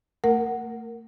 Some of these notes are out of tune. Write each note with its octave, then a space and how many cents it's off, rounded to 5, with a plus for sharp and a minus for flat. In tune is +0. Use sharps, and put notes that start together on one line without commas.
A3 +35 A#4 +0 F#5 +0